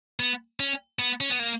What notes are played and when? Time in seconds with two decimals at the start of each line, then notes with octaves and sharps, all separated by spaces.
0.20 B3
0.60 C#4
0.99 B3
1.21 C#4
1.30 B3
1.39 A#3